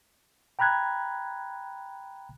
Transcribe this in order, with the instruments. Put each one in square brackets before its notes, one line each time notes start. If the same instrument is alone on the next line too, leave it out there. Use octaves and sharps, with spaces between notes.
[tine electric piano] G5 A#5 B5 F#6 G#6